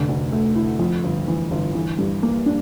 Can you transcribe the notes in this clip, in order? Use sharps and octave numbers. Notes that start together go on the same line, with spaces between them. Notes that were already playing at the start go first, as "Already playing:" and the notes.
Already playing: F1 D3
D2
A3
E4
F2
G1
E3
G1
E3
G2
A#3
D4